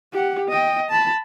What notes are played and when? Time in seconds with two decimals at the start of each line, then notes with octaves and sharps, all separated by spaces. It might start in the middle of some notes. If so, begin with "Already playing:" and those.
0.13 G4 F#5
0.48 D#5 G5
0.90 A5 B5